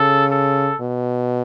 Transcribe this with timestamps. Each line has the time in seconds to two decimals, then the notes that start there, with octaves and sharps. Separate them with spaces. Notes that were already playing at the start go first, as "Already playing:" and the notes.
Already playing: C#3 A4
0.31 A4
0.81 B2